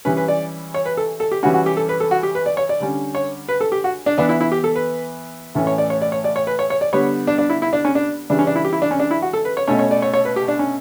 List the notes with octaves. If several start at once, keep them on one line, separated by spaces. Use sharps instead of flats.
E3 G3 C#4 B4
B4
D5
C#5
B4
A4
A4
G4
E3 G3 C#4 F#4
F#4
G4
A4
B4
A4
F#4
G4
B4
D5
C#5
D5
D3 G3 C#4
C#5
B4
A4
G4
F#4
D4
E3 B3 D4
E4
E4
G4
A4
B4
A2 E3 A3 C#4
C#5
D5
C#5
D5
C#5
D5
C#5
B4
C#5
C#5
D5
D3 G3 B3 C#5
D4
D4
E4
E4
D4
C#4
D4
C#3 E3 G3 D4
C#4
D4
E4
G4
E4
D4
C#4
D4
E4
F#4
A4
B4
C#5
B2 A3 C#4 C#5
C#5
D5
C#5
C#5
B4
G4
D4
C#4